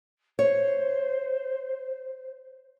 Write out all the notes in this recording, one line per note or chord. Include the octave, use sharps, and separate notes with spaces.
C5 C#5